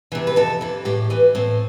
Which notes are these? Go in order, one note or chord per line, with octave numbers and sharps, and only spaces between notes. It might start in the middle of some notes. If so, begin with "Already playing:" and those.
C3 E3
B4
F2 A4
C3 E3
A2 G4
E3 B4
A2 C4